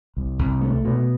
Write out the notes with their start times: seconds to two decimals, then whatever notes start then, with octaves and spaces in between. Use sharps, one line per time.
0.17 C2
0.39 C2
0.61 A3
0.85 B2